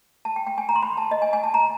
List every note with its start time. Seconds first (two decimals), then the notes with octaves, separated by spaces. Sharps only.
0.25 A5
0.36 G5
0.47 G5
0.58 G#5
0.69 A#5
0.76 C6
0.83 B5
0.97 A5
1.11 D#5
1.22 G#5
1.33 G#5
1.44 A5
1.54 A#5